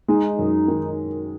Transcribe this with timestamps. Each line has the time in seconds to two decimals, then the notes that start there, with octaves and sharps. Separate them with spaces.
0.08 G#3 D#4
0.39 F#2
0.68 D#3